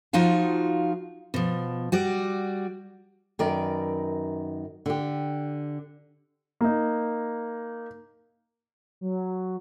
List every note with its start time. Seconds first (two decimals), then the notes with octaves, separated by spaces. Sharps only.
0.13 F3 D#4 F4 F#4 F5
1.34 B2 F3
1.92 G3 F#4 D5
3.39 F#2 D#3 A#4 B4 D5
4.86 D3 G4
6.61 A#3 D#4
9.01 F#3